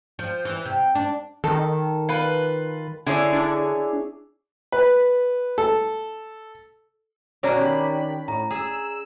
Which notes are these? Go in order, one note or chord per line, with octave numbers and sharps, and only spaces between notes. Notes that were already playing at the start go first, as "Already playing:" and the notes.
F3
E3
C3
D4
D#3 A4
F4 B4
D3 E4 G#4 C#5
D4
B4
A4
B2 C#4 D4 F#4 C#5 D5 A#5
D#3 G4 B5
A2 A#5
G#4 E6